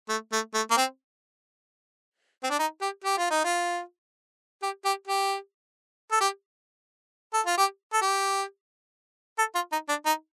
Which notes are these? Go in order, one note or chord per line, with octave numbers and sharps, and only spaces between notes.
A3
A3
A3
A#3
C4
C4
D4
D#4
G4
G4
F4
D#4
F4
G4
G4
G4
A4
G4
A4
F4
G4
A4
G4
A4
F4
D#4
D4
D#4